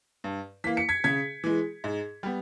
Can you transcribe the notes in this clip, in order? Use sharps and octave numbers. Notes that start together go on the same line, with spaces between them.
G2
E3 A#3 B6
C#7
G#6 B6
C#3 G#6 B6
E3 G#3
G#2
G3 B3